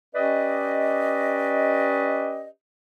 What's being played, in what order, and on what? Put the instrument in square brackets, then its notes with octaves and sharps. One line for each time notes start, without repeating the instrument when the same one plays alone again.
[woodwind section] C#4 G4 B4 D5 D#5